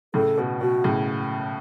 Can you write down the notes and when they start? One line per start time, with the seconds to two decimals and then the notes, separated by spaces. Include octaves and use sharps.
0.14 A2 C#3 A4
0.38 B2
0.61 B2 F#4
0.84 A2 C#3